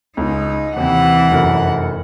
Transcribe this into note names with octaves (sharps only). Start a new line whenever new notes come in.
C#2 D#4
D#2 C3 E3 F#5
F1 F#2 A#4